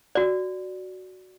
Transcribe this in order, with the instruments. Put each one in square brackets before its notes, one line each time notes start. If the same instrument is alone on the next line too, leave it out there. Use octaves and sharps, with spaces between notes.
[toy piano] F#4 D5